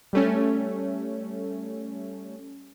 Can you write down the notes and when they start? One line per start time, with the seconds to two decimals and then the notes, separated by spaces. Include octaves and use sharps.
0.13 G3 A3 C#4